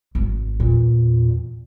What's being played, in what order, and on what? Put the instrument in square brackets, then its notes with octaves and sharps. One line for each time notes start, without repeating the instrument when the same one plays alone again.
[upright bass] G#1
[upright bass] E2 [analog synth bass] A#2